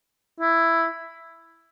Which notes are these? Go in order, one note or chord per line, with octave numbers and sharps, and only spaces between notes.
E4